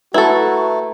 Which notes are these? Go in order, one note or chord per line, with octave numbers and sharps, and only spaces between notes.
A3 E4 F#4 A4 B4 A#5